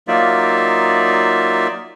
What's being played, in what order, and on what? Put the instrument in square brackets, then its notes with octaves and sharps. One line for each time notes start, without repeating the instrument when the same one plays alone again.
[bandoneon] F#3 A#3 D#4 F4 D5 E5